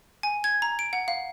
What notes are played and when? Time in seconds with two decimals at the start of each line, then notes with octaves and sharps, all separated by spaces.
0.23 G#5
0.44 G#6
0.62 A#5
0.79 D7
0.93 F#5
1.08 F5